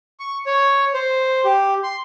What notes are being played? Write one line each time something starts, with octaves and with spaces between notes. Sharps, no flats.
C#6
C#5
C5
G4
C6